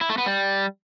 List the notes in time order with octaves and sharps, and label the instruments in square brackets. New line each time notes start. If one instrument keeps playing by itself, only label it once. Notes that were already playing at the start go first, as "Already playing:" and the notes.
[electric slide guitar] E4
A3
B3
G3